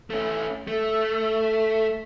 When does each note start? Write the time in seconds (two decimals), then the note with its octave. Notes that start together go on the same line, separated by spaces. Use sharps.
0.10 A3 C#4
0.67 A3